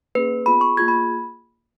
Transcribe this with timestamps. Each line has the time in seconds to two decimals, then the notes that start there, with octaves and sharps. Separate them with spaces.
0.15 A#3 C#4 G#4 B4
0.46 B3 F4 G#4 B5
0.61 C#6
0.77 A#3 F4 G#4 G#6
0.88 B5